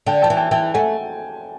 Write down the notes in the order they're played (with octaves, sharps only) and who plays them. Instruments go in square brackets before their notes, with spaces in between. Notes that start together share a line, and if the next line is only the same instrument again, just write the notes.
[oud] D3 [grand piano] G5 A5
[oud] F3 [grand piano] G5 A5
[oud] E3
[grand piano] G5 A5
[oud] E3 [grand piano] G5 A5
[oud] A3 [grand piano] F#5 G#5